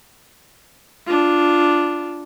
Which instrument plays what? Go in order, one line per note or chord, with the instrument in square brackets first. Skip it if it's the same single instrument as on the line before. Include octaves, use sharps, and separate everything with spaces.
[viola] D4 F4